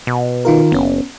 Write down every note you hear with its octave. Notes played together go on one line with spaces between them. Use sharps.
B2
D#3 F4 A#4
F#1 B3 C#4